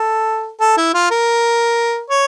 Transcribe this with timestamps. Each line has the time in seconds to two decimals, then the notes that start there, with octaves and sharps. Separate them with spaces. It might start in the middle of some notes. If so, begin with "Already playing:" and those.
Already playing: A4
0.60 A4
0.77 E4
0.94 F4
1.11 A#4
2.10 C#5